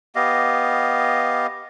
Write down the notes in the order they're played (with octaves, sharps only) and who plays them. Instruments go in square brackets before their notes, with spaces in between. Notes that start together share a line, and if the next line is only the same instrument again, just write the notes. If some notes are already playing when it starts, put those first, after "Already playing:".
[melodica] B3 G4 D#5 F5